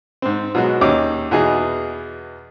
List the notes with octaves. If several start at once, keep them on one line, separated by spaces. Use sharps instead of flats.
G#2 C4
B2 F#3 G#3 F#4
D#2 C#4 D#4 D6
E2 B2 D#4 G#4 D#5